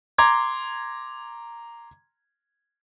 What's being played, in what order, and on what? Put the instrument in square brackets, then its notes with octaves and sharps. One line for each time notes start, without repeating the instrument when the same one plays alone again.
[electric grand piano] A#5 C6 D6 G#6